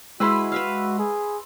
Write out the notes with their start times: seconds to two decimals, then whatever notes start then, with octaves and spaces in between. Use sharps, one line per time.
0.20 G#3 E4 F#4 G#4 B4 B5 C6 E6
0.52 B4 E5 F5
0.99 G#4